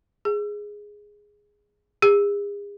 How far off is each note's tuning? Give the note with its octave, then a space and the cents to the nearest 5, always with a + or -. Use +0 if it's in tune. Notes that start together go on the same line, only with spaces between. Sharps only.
G#4 -5
G#4 -40